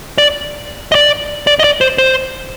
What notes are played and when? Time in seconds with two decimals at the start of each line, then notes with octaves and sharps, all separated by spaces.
0.18 D5
0.92 D#5
0.95 D5
1.47 D5
1.59 D#5
1.64 D5
1.81 C5
1.98 C5